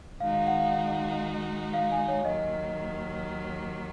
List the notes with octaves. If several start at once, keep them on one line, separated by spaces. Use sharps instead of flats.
D#3 G#3 D#4 F#4 F5
F5
F#5
F5
F5
G#5
C#5
D#2 D#3 F#3 D#5